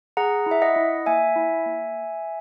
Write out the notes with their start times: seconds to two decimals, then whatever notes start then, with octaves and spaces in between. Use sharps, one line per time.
0.17 G#4 F#5 A#5
0.46 E4
0.51 E5
0.62 D#5 F#5
0.76 E4
1.06 A#3 E5 G#5
1.36 E4
1.66 A#3